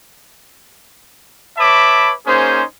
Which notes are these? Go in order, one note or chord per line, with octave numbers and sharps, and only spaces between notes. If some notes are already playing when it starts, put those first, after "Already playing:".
B4 C#5 E5 A5 B5 D6
A#3 C#4 D#4 G#4 C5